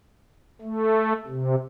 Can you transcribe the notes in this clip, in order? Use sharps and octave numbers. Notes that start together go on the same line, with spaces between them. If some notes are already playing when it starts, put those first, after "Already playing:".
A3
C3